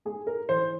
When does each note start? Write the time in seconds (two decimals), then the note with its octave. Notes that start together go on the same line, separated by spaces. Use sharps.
0.05 G#3 G#4
0.27 A#4
0.49 E3 C5